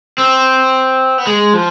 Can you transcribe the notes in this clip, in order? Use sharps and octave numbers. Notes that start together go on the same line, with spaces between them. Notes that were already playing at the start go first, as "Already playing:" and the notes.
C4
B3
G#3
F3